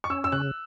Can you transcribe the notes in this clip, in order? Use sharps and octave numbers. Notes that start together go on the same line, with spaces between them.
C#6
C#4 E6
E6
C#3 F#6